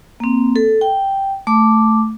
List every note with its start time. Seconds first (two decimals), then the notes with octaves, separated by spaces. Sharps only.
0.20 A#3 C4
0.56 A4
0.81 G5
1.47 A3 A5 D6